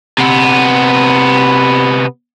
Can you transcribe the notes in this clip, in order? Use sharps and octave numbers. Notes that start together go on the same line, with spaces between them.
C3 B3